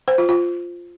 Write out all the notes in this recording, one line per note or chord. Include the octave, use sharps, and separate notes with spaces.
C5
F4
F4